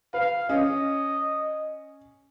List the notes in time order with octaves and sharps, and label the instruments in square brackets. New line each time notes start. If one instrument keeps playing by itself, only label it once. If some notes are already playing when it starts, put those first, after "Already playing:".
[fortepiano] B4 [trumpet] F5
[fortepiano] C#4 [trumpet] D#5